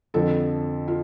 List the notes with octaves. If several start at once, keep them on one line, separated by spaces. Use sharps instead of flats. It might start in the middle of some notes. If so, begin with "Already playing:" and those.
F2 D3 F3 A4
F4